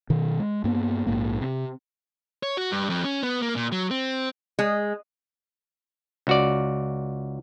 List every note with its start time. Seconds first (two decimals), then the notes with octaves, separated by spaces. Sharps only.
0.10 B2 D#3
0.39 G#3
0.64 G2 A#3 B3
1.07 A#1 F2 G#2 A#3
1.41 C3
2.43 C#5
2.57 F#4
2.71 G2
2.90 F2
3.04 C#4
3.23 B3
3.42 A#3
3.56 A#2
3.72 F#3
3.91 C4
4.59 G#3
6.27 C#2 F#4 D5